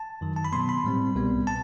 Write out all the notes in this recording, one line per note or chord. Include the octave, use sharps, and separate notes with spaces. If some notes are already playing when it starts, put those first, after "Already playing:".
Already playing: A5
F#2 D#3 F#3
A5
B5
B2 F#3 B3 C6
B5
A2 G3 C4
C2 B2 G3 B3
A5